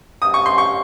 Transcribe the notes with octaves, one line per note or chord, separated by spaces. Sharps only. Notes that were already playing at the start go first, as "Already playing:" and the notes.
D#6
C#6
C6
C#6